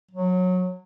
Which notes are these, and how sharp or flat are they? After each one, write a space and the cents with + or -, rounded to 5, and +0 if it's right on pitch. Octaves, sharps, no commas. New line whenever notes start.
F#3 -20